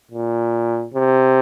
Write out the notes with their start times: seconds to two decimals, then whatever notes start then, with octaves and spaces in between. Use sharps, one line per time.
0.11 A#2
0.94 C3